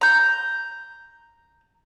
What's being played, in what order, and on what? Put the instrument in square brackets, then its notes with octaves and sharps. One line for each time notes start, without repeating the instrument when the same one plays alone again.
[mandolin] A#5 G6